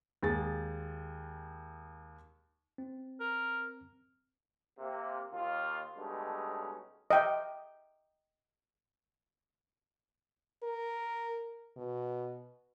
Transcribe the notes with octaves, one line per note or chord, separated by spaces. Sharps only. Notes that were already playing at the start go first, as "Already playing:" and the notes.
D#2 G#3 G#4 A6
C4
A#4
C3 A#3
D#2 F4
G2 B2 G#3 A3 C#4 D#4
D#5 E5 G5
A#4
B2